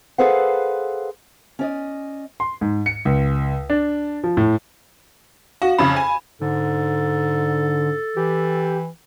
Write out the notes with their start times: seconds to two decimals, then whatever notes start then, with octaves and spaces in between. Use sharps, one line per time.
0.18 G#4 A4 B4 C5 F5 F#5
1.59 C#4 D5 D#5
2.40 C6
2.61 G#2
2.86 C#7
3.05 C#2
3.70 D4
4.24 F3
4.37 A2
5.62 F#4 F5
5.79 F2 C#3 B5
5.96 G#5
6.41 G#2 D3 A4
8.17 E3 G4